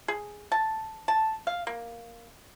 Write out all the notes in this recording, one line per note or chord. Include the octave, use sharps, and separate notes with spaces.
G#4
A5
A5
F5
A#3